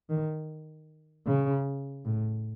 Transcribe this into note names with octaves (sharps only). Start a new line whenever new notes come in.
D#3
C#3
A2